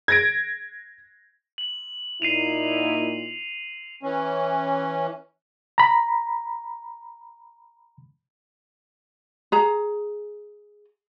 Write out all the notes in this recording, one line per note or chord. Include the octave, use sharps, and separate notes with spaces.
G#6 A#6 D7
F#7
A#2 D#4 E4 C7 D#7 F7
E3 C#4
A#5 B5
G#4 A#5